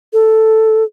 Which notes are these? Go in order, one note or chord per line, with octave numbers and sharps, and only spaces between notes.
A4